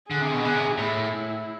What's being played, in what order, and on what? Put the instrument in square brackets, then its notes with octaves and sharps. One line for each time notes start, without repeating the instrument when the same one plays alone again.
[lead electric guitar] D3 [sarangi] G#4
[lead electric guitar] C3
B2
D3
C3
[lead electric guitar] A2 [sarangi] E4